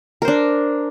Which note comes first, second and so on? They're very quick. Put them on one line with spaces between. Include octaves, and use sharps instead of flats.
A#4 C5 D4